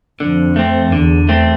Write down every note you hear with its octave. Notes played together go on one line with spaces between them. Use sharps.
F2 D3
A3 C4
E2 D3
A3 C4